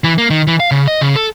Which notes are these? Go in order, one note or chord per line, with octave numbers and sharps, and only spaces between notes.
E3
A#3
D#3
E3
F5
C#3
D#5
C#3
A4